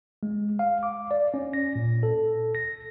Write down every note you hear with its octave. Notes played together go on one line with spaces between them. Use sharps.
G#3
F5
D6
D5
C#4
A#6
A#2
A4
A#6